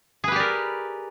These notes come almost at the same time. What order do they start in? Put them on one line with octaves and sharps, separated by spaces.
G#4 B4 G4 D5 A#4